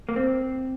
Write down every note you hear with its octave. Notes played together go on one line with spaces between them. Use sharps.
A#3
C4